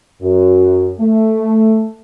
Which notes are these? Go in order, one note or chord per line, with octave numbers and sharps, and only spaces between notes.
F#2
A3